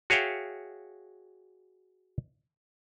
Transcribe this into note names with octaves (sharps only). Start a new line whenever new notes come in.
F#4 G#4 C#5 E5 F5 G5